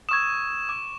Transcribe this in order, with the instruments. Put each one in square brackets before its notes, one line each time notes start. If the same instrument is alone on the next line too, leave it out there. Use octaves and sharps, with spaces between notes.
[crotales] C#6 E7 [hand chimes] D#6 E6 G#6
[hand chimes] D6